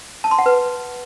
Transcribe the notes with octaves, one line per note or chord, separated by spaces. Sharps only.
A5
C6
F#5
B4